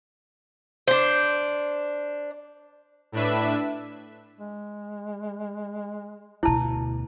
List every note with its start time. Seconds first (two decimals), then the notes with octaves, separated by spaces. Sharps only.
0.88 D4 C5
3.12 A2 D4 B4 E5
4.39 G#3
6.43 D2 B2 E4 A5